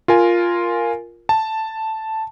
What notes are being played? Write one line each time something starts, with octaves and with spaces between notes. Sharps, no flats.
F4 A#4 G#5
A5